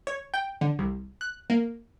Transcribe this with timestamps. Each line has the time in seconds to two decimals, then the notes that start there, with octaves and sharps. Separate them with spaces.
0.07 C#5
0.34 G5
0.61 D3
0.79 C2
1.21 F#6
1.50 A#3